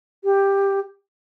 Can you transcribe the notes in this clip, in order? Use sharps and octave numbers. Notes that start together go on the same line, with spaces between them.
G4